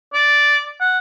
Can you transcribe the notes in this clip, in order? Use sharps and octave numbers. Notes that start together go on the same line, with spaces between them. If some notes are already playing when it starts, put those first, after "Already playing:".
D5
F#5